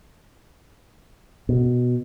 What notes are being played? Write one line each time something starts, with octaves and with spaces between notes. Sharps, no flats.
B2